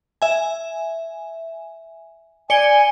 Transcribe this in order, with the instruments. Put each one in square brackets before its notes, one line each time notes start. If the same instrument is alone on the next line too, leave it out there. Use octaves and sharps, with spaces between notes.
[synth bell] E5 G#5
[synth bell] D5 C#7 G7 [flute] G#5